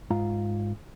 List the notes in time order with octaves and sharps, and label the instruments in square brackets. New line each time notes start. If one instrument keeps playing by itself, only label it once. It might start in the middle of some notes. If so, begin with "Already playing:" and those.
[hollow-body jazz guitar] G#2 F4 A#5